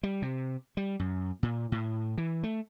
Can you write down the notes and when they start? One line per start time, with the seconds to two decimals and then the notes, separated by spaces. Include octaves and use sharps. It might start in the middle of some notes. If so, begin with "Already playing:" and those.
0.03 G3
0.22 C3
0.77 G3
0.99 F#2
1.43 A#2
1.72 A2
2.18 E3
2.43 A3